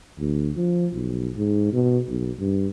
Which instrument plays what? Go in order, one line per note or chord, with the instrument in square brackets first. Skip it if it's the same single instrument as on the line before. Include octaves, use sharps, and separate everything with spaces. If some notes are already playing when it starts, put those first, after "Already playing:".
[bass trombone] D2
F3
B1
G#2
B2
B1
G2